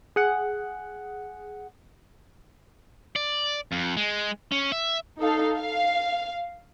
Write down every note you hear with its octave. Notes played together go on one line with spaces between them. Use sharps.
G#4 F#5
D5
F2
G#3
C#4
E5
D#4 A4 F5
F5